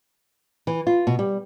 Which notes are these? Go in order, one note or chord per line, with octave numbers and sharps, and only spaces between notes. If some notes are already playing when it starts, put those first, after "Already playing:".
E3
F4
B2
G3